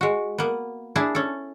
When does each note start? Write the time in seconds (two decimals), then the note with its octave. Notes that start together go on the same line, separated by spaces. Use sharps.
0.01 G#3 F#4
0.38 A#3 B3
0.95 D4 E4 G#4 A5
1.15 C#4 A4